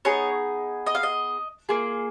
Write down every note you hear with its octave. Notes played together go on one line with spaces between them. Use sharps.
B3 D#4 G#4 C#5
D#5
F5
D#5
A#3 F4 G#4